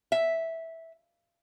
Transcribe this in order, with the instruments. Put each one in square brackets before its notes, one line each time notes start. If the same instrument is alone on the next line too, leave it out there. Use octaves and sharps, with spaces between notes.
[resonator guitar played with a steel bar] E5